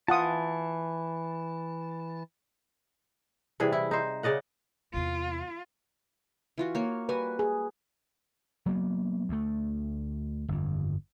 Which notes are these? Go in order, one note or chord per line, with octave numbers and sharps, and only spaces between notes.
E3 F4 F#5 A5 D#6
C3 E3 G3 G#4
E4
D#4 C5
C#3 D5 D#5 F#5
E2 C3 F4
E3 F4 F#4
A#3 C#5
G3 F#4 B4 G#5
G#4
F#3 A#3 B3
D2 A3
G1 F2